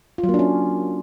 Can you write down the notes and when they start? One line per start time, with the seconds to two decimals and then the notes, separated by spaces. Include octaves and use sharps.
0.18 F4
0.23 F#3
0.29 A#3
0.34 D4
0.39 C#4